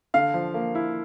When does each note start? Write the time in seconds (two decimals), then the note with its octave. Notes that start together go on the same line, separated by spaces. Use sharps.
0.14 D3 F5
0.34 F3
0.54 A#3
0.75 E4